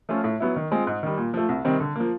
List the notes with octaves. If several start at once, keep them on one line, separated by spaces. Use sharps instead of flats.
F3 A3 C#4 F4
A2
F#3 B3 E4
D#3
G#3 C4 F4
G#2
D#3 G3
A#2
F3 A3
C2
C3 D#3 G3 C4
D3
F3 A#3